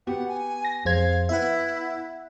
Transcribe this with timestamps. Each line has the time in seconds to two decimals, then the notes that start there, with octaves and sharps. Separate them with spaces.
0.07 B3 F#4 G4 F#5
0.28 G#5
0.65 A#6
0.85 F2 G#4 C5 F5 G#6
1.29 B3 E4 B4 E5 F#5